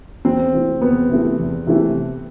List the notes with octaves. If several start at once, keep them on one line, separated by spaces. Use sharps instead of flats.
E2 C4
C3 E3 A3
E2 B3
C3 E3 A3
E2
C3 E3 A3